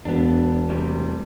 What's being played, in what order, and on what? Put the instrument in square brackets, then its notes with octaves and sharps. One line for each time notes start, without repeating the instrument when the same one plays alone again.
[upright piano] E1 [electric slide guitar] B3 D4
[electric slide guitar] A2 C3 G3